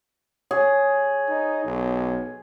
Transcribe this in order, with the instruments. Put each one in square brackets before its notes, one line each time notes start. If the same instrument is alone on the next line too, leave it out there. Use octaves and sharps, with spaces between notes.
[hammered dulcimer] G#4 [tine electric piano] C#5
[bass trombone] D#4
B1